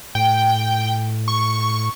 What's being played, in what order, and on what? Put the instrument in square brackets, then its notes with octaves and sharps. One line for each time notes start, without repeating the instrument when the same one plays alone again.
[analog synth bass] A2 [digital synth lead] G5
[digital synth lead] C#6